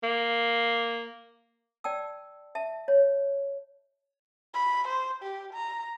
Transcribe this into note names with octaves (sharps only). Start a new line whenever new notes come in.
A#3
D5 G5 A5 E6
E5 A5
C#5
B5
C5
G4
A#5